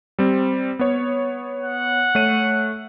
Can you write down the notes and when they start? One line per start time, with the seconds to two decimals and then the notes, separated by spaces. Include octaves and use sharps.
0.19 G3 C4
0.79 B3 C#5
1.63 F#5
2.15 A3 C#5 D#7